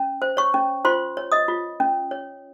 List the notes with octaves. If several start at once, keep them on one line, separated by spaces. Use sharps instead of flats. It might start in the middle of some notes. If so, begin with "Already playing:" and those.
Already playing: C#4
C5
C#5 C#6
C#4
F4 C5 C6
C#5
D#5 D#6
F4
C#4
C#5